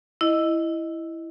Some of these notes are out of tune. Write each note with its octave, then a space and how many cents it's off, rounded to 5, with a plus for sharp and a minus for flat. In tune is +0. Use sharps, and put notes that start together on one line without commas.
E4 +0 D#5 +0